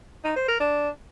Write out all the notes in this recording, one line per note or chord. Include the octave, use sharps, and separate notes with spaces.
D#4
C5
A#4
D4